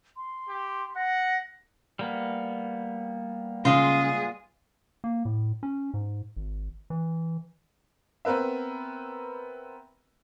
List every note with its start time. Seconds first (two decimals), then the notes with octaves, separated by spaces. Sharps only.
0.17 C6
0.49 G4
0.96 F#5 A#6
1.99 G3 A#3 B3
3.65 C#3 G#3 F4 G#4
5.04 A#3
5.25 A2
5.63 C#4
5.94 G#2
6.36 G#1
6.90 E3
8.25 B3 C4 A#4 B4 E5